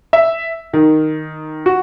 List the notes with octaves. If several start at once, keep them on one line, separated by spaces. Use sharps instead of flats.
E5
D#3
F#4